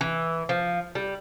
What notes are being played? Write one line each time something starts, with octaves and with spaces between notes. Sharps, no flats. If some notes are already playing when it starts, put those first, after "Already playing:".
E3
F3
G3